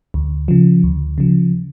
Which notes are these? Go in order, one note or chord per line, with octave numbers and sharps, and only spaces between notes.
D2
C#3 F3
D2
C#3 F3